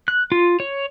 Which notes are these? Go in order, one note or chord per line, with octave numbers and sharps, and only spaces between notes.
F#6
F4
C#5